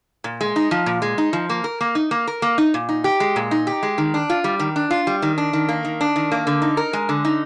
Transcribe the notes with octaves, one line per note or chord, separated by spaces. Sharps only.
A#2
G#3
D#4
F3
A#2
G#3
D#4
F3
A#3
A#4
A#3
D#4
A#3
A#4
A#3
D#4
A#2
D#4
G4
G#3
A#2
D#4
G4
G#3
D#3
D4
F4
G3
D#3
D4
F4
G3
D#3
D4
D#3
A#3
D#3
D4
D#3
A#3
D3
D#4
A#4
G#3
D3
D#4